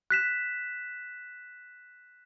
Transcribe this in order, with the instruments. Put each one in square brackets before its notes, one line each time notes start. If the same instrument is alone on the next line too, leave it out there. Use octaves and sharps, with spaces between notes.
[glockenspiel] F#6 B6 E7